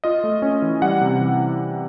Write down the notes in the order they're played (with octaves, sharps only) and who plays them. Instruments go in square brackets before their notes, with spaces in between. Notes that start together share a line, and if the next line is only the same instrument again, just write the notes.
[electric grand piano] F4 D#5
A3
C#4
E3
G3 F#5
C3
E3